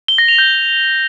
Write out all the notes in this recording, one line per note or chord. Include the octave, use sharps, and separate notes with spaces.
G7
A#6
F7
G6